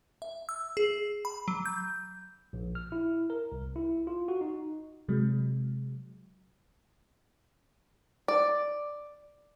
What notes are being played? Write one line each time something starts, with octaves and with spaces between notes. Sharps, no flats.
E5
E6
G#4
B5
F#3
G6
A#1
F6
E4
A#4
C2
E4
F4
F#4
D#4
C3 F#3 G#3
D5